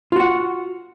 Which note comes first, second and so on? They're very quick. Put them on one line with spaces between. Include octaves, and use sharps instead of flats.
F4 F#4 F#5